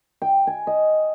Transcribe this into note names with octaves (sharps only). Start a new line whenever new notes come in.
G5
G#5
D#5